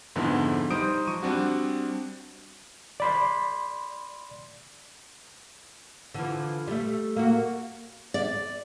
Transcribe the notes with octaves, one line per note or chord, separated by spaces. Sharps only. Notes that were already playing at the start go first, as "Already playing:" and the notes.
F2 G#2 D3 F3 B3 E4
G3 D#4 C5 D#6 D7
F3 C#6 D#7
G3 C4 D4 F#4
D5 B5 C6
D3 E3 F3
G3 A3
A#3 F#4
D5